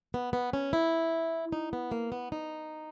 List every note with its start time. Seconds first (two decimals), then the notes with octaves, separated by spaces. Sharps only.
0.14 B3
0.33 B3
0.53 C#4
0.73 E4
1.52 D#4
1.73 B3
1.92 A#3
2.12 B3
2.32 D#4